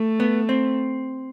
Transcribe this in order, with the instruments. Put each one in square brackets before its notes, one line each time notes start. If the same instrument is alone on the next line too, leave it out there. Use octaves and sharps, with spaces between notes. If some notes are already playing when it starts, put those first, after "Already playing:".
Already playing: [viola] A3
[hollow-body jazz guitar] B3
C4